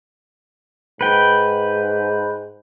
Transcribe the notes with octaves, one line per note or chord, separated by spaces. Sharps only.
G#2 B4 G5